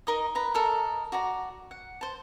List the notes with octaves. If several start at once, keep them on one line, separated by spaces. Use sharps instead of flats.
D#4 A#4 D#5 D#6
B4 A#5
A4 A#4 D#5
F#4 D5 A#5
F#5
C5 A5